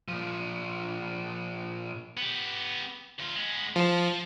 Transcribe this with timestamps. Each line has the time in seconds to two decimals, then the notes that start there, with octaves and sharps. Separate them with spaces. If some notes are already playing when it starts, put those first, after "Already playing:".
0.08 A#2 F3
2.17 B3 G4
3.19 D2 F4
3.35 G#3 B3
3.76 F3 F4 A5